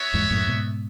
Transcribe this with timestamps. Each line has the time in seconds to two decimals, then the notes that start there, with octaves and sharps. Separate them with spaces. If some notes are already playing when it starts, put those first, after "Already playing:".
Already playing: B3 F#4 C#5 E5
0.14 E2 G#2
0.31 F#2 A2
0.47 G#2 B2